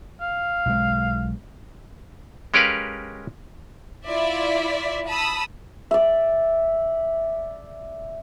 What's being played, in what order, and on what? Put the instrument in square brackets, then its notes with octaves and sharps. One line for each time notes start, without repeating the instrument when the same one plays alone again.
[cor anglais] F5
[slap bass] B1 G#3
[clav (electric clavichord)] G#3 C#4 G4 A#4 B4 F5
[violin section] E4 F4 D5 E5
A5 B5 D#6 E6
[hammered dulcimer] D5 E5